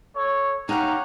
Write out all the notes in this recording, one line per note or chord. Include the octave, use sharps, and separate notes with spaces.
A4 C#5
C#4 D#4 G4 F5 F#5 A#5